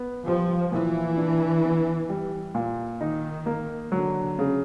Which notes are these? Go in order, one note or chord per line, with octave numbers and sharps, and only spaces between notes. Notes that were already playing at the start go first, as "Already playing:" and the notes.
Already playing: B3
F3 G3
A#2 E3
D4
B3
G3
A#2
D#3 D#4
A#3
D3 F#3
C#3